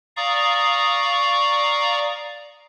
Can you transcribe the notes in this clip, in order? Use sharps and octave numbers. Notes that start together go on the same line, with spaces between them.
D5 F5 A#5 C#6 D#6